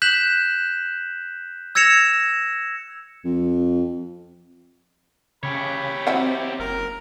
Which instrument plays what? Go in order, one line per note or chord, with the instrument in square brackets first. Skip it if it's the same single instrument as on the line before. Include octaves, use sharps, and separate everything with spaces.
[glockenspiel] F#6 G6 B6 E7 F#7
E6 G#6 A#6 C#7 E7 F7
[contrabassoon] F2
[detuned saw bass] C#3 [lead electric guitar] G4 C#5 [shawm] B5
[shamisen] F#3 E4 F#5 [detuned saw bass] C4
[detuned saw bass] F#1 [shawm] A#4